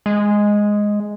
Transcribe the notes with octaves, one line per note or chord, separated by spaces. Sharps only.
G#3